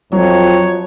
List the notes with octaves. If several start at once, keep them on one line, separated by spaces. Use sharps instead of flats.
F2 F#3 C#5